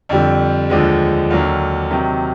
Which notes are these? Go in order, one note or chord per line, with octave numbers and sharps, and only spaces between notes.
F2 D3 G3
D#2 D3 F3 G#3
D#2 D3 F#3 A#3
C3 D#3 F#3